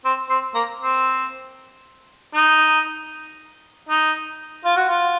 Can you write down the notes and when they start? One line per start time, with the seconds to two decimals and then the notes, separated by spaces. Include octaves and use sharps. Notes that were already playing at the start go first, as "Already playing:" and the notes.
0.05 C4
0.30 C4
0.55 A#3
0.80 C4
2.34 D#4
3.89 D#4
4.65 F4
4.77 F#4
4.88 F4